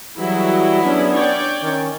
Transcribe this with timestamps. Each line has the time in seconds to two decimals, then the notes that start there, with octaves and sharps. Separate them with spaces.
0.18 E3 F#3 G3 E4 F#4 G#4
0.84 B3 C#4 D4
1.13 C#5 D5 G5
1.62 D#3 C#4